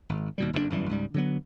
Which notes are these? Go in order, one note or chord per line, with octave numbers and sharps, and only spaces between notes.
G#1
D#2 B2 G3
F#1 F2 A2 D4
G1 F#2 E3 G3
C#2 G#2 G3
D3 F#3 B3